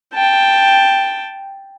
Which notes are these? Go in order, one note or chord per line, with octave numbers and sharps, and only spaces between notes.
G5 A5